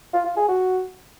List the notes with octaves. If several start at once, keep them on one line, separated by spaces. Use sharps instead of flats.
F4
F4
G#4
F#4